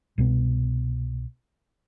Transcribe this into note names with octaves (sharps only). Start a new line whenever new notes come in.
C2 B2 E3 B3